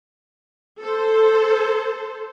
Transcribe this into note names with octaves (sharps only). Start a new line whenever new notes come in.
A4 C5